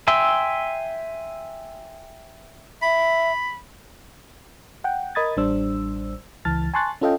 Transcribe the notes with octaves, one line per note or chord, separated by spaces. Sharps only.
E5 G5 G#5 C6 E6
E5 B5
F#5 G5
A#4 D#5 B5 D#6 G#6 A6
A1 G3 D4 C5 E6
C#2 E3 A5 F6 A6
G#5 A5 C6 C#6 F#6 A6
C#4 F4 A4 D#5 F5 G5